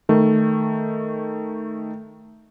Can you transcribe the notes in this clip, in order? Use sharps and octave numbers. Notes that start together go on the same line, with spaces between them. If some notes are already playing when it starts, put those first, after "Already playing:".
D#3 A3